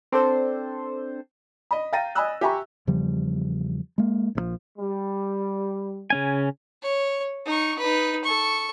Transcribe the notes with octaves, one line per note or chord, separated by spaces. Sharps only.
C4 D4 A4 C5
D#5 B5
F5 G5 A#5 A6 A#6 D#7
D#5 G#5 B5 D#6 E6 F#6
G4 E5 G#5 A#5 B5 C#6
E2 C#3 F3 G3
G#3 A#3
A#1 C#3 F3
G3
C#3 C#4 G#5
C#5
D#4 C#6
D#4 B4
A4 C#6